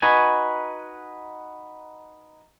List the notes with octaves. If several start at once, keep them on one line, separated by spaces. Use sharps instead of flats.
D#4 F#4 B4 G#5